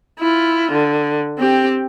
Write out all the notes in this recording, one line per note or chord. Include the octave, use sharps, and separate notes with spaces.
E4 F4
D3
C4 G4